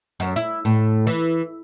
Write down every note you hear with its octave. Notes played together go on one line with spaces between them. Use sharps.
F#2
E4
A2
E3